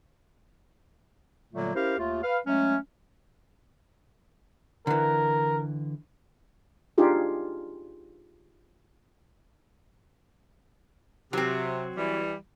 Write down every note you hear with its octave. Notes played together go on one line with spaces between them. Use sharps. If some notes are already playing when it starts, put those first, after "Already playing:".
A#2 D3 F#3 G3 A3 A#3
C#4 E4 G4 A#4 C5 F5
D#2 A3 F4
B4 F5
F#3 G#3 A3 C#4
D3 E3 A#4
D4 D#4 F4 G4 G#4
C3 F#3 C4
E3 G3